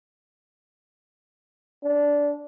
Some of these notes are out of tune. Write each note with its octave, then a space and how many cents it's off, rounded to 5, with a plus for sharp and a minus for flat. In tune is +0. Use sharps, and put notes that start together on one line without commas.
D4 -15